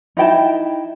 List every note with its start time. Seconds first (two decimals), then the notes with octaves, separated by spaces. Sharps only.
0.17 D#4 E4 G5 A5